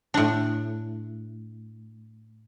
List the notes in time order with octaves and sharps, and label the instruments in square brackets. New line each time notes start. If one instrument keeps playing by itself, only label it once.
[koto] A2 D4